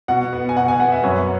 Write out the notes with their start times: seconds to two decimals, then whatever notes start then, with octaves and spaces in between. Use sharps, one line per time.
0.08 B2 F#5
0.33 B3
0.49 G#5
0.56 B2 F#5
0.68 G#5
0.80 B3 F#5
0.92 E5
1.03 F#2 C#5